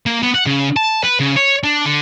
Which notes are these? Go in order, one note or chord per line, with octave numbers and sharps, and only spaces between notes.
A#3
B3
F#5
C#3
A5
B4
C#3
C#5
D4
D3